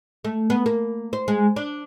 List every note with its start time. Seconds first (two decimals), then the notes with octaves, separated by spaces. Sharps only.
0.25 A3
0.50 B3
0.66 A#3
1.13 C5
1.28 G#3
1.56 D4